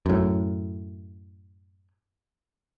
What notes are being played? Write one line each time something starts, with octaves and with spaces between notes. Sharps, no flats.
F#2 A2